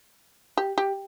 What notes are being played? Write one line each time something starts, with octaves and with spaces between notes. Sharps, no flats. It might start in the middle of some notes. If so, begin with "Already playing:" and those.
G4
G4